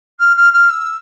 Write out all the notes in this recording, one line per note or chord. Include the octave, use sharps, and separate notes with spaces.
F6
F6
F6
E6